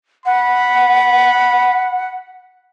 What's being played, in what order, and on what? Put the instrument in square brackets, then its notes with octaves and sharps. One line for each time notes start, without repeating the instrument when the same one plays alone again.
[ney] F#5 [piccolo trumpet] B5